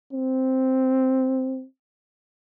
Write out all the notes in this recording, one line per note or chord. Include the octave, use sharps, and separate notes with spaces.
C4